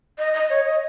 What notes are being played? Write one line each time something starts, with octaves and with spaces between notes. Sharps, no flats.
D#5
D#5
C#5
D#5